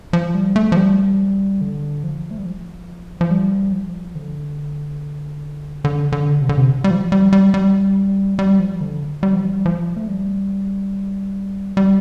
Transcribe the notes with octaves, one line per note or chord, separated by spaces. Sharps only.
F3
G3
A3
F3
G3
D3
F3
A3
G3
F3
F3
G3
F3
D3
D3
D3
C3
D3
C3
G3
F3
G3
G3
G3
G3
F3
D3
G3
F3
G3
F3
A3
G3
G3